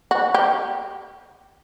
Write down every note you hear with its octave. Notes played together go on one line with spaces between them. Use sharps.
F#4
G4